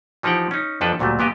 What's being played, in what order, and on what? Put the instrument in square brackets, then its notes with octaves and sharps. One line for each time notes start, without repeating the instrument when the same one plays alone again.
[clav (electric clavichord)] E3 F3 D#4 G4 F#5 G5
C#4 D#4
F2 F3 D4 A4 B4
D2 A#2 F#3 G3 A3
A#2 B3 G4 D#5